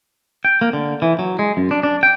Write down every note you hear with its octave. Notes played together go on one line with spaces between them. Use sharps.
G5
A#3
D3
E3
F#3
G#3
F#2
D4
D4
G5